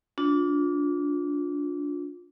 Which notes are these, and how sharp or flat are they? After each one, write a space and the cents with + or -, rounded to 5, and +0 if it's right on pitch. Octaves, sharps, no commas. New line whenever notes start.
D4 -20 F4 +25